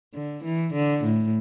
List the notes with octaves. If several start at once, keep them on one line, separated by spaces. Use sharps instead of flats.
D3
E3
D3
A2